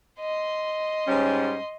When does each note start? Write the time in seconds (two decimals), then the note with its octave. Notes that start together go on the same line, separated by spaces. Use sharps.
0.20 D#5 C6
1.08 G#2 G3 C#4